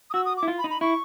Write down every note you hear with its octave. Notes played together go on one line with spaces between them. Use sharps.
D#6
F#4 E6
D#6
D6
E4
F4
B5
D#4
B5
E4 C#6